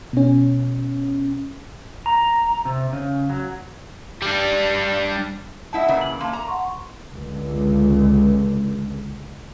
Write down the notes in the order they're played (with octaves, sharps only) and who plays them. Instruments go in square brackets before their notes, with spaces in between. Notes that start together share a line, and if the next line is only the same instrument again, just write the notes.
[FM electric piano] B2 C#4
[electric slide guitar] A#5
C3
C#3
F#3
[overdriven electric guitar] G3 D4
[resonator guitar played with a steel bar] G#2 E4 D#5 [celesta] E5 F#5 A5
[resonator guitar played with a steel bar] A#2 C#3 E3
[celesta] F#7
[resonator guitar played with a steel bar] A#3 [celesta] A5 C6
[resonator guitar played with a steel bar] A#5
[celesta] F#5 C6 C#6
[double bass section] C#2 D3